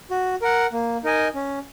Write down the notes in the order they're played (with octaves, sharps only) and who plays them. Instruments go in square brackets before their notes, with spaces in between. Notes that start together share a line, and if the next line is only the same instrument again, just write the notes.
[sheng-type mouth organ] F#4
A#4 F#5
A#3
D#4 A#4 D#5 G#5
C#4